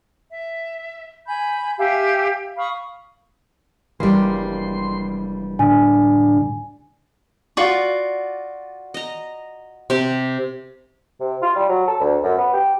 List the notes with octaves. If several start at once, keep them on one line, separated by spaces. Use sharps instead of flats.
E5
G#5 B5 G6
G4 E5 F5 G#5
F5 B5 C#6 D#6
F1 E3 G3 A#3 C6
A2 D3 D4 G#5
F4 F#4 D5
D#5 A#5
C3 G4
C3
F4
G3
F#3
A4
D2
F#2
B3
G4